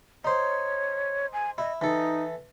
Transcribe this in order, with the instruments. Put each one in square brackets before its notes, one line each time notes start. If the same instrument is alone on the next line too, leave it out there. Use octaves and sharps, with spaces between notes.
[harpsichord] D#4 C5 [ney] C#5
[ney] G#5
[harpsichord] E4 [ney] D#5
[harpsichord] E3 A4 [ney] D#4